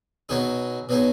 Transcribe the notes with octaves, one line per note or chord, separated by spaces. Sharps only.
B2 F#3 B3 D#4 G#4
B2 F#3 B3 D#4 G#4